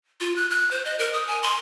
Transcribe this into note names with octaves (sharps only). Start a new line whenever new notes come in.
F4
F#6
F#6
C5
D#5
A#4
D#6
G#5
C6